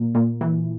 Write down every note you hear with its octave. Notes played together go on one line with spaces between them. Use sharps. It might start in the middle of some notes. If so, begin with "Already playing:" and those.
Already playing: A#2
A#2
E3